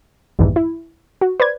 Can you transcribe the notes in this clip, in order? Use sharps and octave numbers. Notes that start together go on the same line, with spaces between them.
A#1 E2 G2 D#3 E3
E4
F#4
B4 C5 D5 G#6